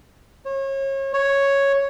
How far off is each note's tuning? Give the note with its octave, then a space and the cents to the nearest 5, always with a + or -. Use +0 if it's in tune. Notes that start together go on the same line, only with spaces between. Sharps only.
C#5 -35
C#5 +0